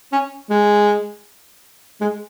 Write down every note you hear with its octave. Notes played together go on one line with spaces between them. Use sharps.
C#4
G#3
G#3